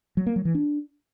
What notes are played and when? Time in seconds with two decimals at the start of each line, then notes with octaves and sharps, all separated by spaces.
0.17 F#3
0.26 A#3
0.36 F#3
0.45 E3
0.55 D4